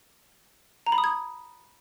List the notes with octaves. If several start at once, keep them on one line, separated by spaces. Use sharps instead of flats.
A#5
B5
D#6
G#6